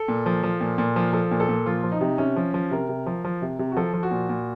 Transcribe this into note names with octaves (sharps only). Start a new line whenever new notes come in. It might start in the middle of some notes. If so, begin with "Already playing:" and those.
Already playing: A4
A#2
F3
F3
A#2
A#2
F3
F3 A4
A#2
A4
A#2
F3 F4
F3
D#4
C3
C3 C#4
F3
F3
C3 A#4
C3
F3
F3
C3
C3
F#4
F3 A4
F3
F#4
A#2
A#2